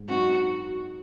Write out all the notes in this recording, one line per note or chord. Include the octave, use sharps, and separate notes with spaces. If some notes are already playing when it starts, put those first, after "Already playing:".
Already playing: G#2
F#3 C4 D#4 F#4